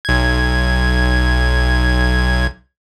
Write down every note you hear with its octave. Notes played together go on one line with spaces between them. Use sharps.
B1 G#6